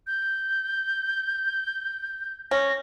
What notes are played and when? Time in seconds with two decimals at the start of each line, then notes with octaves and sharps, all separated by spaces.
0.07 G6
2.51 C#4 A#6